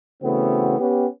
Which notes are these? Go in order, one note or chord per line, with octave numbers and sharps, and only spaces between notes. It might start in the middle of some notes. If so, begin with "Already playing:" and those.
C#3 E3 A3 B3 C4 F#4
B3 C#4 G4